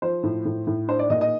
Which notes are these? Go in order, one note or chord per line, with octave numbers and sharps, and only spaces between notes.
F3 C5
A2
A2
A2
D4 C5
D5
A#2 D#5
D#5